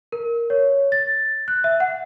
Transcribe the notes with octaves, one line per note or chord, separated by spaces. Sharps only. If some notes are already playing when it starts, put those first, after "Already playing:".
A#4
C#5
A6
F#6
E5
F#5